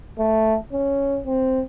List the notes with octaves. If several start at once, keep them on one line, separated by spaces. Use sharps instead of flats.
A3
C#4
C4